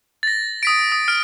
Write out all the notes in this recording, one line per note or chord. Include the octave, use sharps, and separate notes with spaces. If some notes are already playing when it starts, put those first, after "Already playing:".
A6 A#6
D#6 B6 D7
D#6
F6 D7